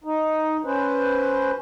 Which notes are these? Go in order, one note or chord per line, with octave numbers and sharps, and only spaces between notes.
D#4
C#4 B4 C5